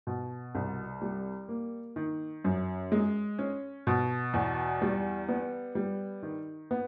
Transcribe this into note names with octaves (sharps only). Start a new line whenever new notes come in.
B2
C2
G3
A#3
D#3
F#2
G#3
C#4
B2
E2
G3
B3
G3
D#3
B3